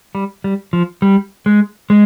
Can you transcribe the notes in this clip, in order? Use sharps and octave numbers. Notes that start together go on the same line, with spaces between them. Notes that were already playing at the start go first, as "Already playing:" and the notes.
G3
G3
F3
G3
G#3
G#3